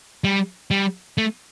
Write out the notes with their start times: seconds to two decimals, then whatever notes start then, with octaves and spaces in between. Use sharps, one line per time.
0.24 G3
0.71 G3
1.18 A3